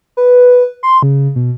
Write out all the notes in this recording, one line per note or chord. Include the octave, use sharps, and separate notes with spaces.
B4
C6
C#3
B2